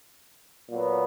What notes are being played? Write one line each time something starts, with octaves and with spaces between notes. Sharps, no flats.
A#2 F#3 B3